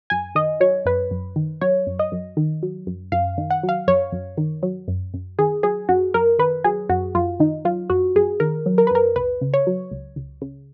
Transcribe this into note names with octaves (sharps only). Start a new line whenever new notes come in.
F#2 G#5
D#3 D#5
F#3 C#5
F#2 B4
F#2
D#3
F#3 C#5
F#2
D#5
F#2
D#3
F#3
F#2
F#2 F5
D#3
F#5
F#3
F5
F#2 C#5
F#2
D#3
F#3
F#2
F#2
D#3 G#4
F#3 G#4
F#2 F#4
F#2 A#4
D#3 B4
F#3 G#4
F#2 F#4
F#2 F4
D#3 D#4
F#3 F4
F#2 F#4
F#2 G#4
D#3 A#4
F#3
A#4
B4
F#2 A#4
C#2 B4
C#3
C#5
F#3
C#2
C#2
C#3